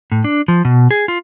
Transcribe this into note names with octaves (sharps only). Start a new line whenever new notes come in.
A2
D4
F3
B2
G#4
F4